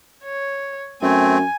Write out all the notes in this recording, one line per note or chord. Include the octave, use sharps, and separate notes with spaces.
C#5
F#2 A3 C4 G#5